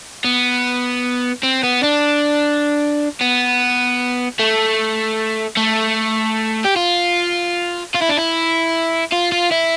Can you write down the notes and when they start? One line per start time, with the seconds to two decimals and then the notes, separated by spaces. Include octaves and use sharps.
0.25 B3
1.43 C4
1.63 B3
1.83 D4
3.21 B3
4.40 A3
5.57 A3
6.64 G4
6.76 F4
7.94 F4
8.01 E4
8.09 D4
8.17 E4
9.12 F4
9.32 F4
9.52 E4